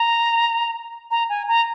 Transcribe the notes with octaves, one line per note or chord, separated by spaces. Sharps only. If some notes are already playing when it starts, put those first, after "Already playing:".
Already playing: A#5
A#5
G#5
A#5